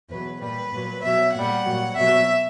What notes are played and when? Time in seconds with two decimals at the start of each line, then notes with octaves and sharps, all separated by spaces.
0.09 E2 B2 F#3 B4
0.40 A#2 G3 B4
0.71 A#2 F#3
1.02 B2 F#3 E5
1.33 A#2 G3 F#5
1.65 A#2 F#3
1.96 B2 F#3 E5